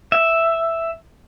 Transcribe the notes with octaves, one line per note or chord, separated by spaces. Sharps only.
E5